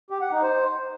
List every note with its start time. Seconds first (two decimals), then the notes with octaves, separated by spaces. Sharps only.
0.10 G4
0.21 F#5
0.32 D#4
0.42 C5